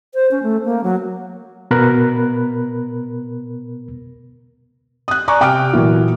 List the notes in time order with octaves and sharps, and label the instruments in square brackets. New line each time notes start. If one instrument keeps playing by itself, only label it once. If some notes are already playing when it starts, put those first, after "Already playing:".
[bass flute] C5
C#4
A3
A#3
F#3
[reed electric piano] B2 B3 A#4 B5 F#6
[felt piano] D#6 F#6
D5 G#5 A#5 C#6 D6
C3 G5 D6 F6 D7
A#2 E3 F#3